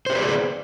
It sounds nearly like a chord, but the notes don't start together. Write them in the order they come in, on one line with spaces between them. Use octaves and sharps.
C5 G4 B4 D5 G#4